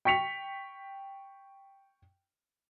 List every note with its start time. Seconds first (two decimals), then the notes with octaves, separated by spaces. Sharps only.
0.05 G5 C#6 B6 C#7 F7